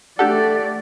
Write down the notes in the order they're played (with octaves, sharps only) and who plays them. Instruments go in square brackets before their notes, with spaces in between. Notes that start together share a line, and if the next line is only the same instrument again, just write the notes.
[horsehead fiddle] A3 D5 [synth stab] D4 G4 A4 [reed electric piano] F#5